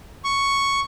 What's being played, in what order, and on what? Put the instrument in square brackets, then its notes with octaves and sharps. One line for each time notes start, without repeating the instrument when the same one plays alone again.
[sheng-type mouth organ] C#6